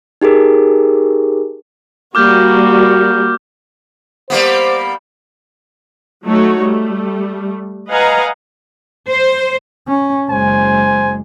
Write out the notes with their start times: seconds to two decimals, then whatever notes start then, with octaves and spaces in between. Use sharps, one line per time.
0.22 D#4 G4 G#4 A#4
2.15 G3 A#3 F#4 D6 F6 G6
4.30 G3 A#3 B3 C5
6.26 F#3 A3 D#4 F#4 C#5
6.61 G3 A3
7.90 B4 D#5 F5 F#5 G#5 A#5
9.10 C5
9.88 C#4
10.30 F#1 G#3 C5 G#5